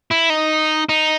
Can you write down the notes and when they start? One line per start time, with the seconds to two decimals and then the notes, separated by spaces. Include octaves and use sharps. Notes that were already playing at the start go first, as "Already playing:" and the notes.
0.11 E4
0.30 D#4
0.89 D#4